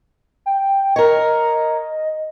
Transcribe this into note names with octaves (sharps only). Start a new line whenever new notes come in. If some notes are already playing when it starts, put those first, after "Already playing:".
G5
A#4 C#5 D#5